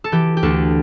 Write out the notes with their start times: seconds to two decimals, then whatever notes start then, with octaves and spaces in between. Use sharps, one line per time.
0.04 A4
0.12 E3 G4
0.37 G4
0.43 D2 A4